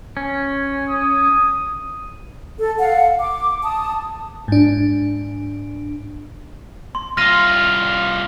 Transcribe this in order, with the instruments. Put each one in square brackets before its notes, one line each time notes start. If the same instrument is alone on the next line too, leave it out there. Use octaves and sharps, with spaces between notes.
[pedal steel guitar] C#4
[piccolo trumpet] D#6
[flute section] A4
F5 F#5
D6
A5 D#6
[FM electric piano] G#2 D4
[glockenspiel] C6
[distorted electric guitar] C2 F4 [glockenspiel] F6 A#6 D#7